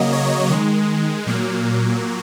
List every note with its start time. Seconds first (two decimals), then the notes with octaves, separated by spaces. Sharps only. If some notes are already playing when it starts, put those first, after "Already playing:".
Already playing: C#3 F#3 A#3 D#5
0.13 C#5
0.50 D#3 G#3
1.26 A#2 F#3 A#3